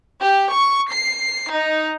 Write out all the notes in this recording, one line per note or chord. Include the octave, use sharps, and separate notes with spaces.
G4
C#6
C7
D#4